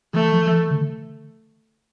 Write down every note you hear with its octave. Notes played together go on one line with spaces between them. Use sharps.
E3 A3
F3
F3
E3
D3